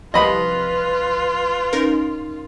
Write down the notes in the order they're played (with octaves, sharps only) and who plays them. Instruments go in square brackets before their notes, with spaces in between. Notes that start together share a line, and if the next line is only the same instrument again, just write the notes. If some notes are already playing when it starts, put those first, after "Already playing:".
[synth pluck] C2 F3 [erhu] F4 [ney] B4 [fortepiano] D#5 B5
[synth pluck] C#4 D#4 A#4